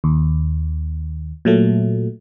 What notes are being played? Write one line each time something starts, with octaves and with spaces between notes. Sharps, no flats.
D#2
A#2 F#3 A3